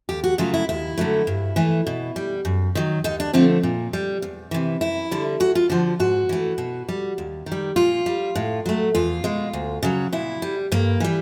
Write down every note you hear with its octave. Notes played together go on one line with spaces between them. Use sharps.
D#2 G4
F#4
C#3 F#3 A3 F4
E4
D#2 E4
D3 F#3 A3
G2
E3 A3
B2
G3
F#2
D#3 F#3
D#2 D#4
D4
D3 F3 A3 C4
A#2
G3
E2
C3 E3
F#2 E4
D3 G3
D2 F#4
F4
D3 F3 F#4
G#2 F#4
E3 A3
B2
G3
D#2
D#3
G3
A#2 F4
G3
A2
F#3 A3
E2 F4
B2 G#3
D2
C#3 F#3
A#2 E4
G3
G2 A#3
E3 G3